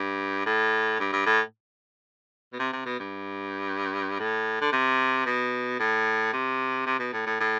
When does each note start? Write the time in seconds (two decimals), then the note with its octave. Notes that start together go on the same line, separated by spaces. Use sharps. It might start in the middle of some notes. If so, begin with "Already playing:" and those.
Already playing: G2
0.46 A2
1.00 G2
1.13 G2
1.26 A2
2.53 B2
2.59 C3
2.73 C3
2.86 B2
2.99 G2
4.20 A2
4.62 D3
4.72 C3
5.26 B2
5.79 A2
6.33 C3
6.86 C3
6.99 B2
7.13 A2
7.26 A2
7.40 A2